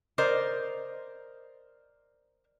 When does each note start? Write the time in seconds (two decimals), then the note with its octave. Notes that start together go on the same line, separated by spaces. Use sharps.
0.18 A#4 C5 D5 D#5